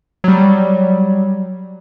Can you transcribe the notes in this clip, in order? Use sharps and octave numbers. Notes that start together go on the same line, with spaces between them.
F#3 G3